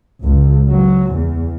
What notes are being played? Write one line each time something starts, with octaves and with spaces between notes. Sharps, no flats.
C#2
F#3
E2